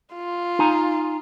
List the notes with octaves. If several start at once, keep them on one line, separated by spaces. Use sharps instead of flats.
F4
D#4 G#5 A#5